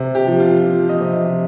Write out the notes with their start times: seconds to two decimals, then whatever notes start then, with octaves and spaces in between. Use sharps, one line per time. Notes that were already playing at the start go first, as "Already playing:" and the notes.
Already playing: C3
0.15 G4
0.27 F3
0.40 F4
0.64 F3
0.89 D#5
1.01 C3
1.13 D#5